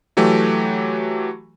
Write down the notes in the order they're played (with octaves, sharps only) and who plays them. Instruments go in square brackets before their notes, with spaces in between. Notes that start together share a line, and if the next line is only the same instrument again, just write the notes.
[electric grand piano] E3 F#3 A3 G4